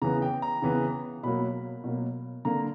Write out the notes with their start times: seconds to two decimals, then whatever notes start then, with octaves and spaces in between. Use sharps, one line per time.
0.02 C#3 E3 B3 A#5
0.22 G5
0.42 A#5
0.62 C#3 E3 B3
1.23 B2 F#3 A#3 B5
1.84 B2 F#3 A#3
2.45 D3 A#3 A#5